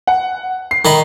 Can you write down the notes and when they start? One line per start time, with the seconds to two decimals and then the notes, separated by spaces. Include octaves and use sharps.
0.07 F#5
0.71 C7
0.85 D#3 D#5 B5